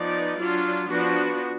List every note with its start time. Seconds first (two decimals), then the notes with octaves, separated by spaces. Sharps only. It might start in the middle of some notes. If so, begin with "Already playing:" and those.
Already playing: F3 B3 D#4 D5
0.40 F#3 D4 F4
0.90 F3 B3 D4 F#4